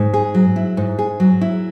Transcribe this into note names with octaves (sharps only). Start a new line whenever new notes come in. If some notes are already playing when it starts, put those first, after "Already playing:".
Already playing: G#2
G#4
F#3
E4
G#2
G#4
F#3
E4